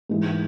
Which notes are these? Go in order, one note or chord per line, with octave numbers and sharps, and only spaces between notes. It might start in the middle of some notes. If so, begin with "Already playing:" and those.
G#2 E3 G#3